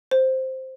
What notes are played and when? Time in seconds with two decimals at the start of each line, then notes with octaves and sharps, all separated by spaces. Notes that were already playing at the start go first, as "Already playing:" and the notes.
0.11 C5